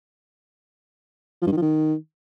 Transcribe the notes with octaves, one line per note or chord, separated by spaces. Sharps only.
F3
G2
D#3
F3
D#3